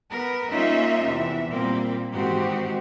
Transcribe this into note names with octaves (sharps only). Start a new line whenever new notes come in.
B3 A#4 B4
G3 A#3 C#4 D#4 F4 E5
E2 C3 E3 E5
A#2 G3 A#3 C4
G#2 D#3 E3 C4 F#4 G4